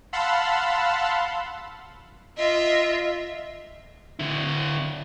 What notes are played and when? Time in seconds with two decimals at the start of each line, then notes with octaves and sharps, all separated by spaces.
0.13 F5 F#5 A5 B5 C6 E6
2.37 F4 D#5 E5
4.19 D3 E4